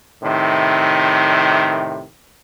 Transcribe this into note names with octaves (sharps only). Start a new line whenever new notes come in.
A2 C3 D#3